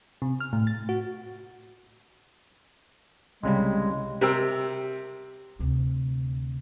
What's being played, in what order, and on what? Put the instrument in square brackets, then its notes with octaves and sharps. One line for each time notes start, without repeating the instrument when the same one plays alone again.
[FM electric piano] C3
F6
A2
A6
F#4
[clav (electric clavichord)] C2 C#3 G3 [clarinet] G#3
[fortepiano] C3 G4 A#4 G5 E6
[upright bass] D2 C3